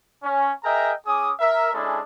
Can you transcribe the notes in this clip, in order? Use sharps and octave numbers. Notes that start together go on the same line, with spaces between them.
C#4
G#4 A#4 D#5 E5 G5 A#5
C#4 G#4 D6 D#6
A#4 E5
G#3 C#4 D4 E4 G#4 A4